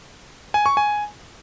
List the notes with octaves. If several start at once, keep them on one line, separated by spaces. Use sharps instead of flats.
G#5
C#6
G#5